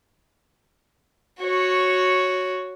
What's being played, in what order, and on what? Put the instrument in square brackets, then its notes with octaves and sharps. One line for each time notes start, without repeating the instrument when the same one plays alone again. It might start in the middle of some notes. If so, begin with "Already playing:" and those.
[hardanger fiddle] F#4 C#5